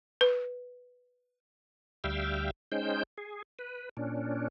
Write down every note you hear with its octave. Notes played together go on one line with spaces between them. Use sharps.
B4
D2 G3 E5 F5 G5
G#3 C#4 D#4 C5 G5 G6
G#4
B4
A#2 C#4 D4